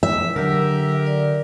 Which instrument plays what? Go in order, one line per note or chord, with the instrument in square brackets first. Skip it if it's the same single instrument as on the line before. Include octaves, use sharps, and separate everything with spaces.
[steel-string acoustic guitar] E5
[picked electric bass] D3 [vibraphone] F#3 E6 [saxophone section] G4 A#4
[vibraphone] D5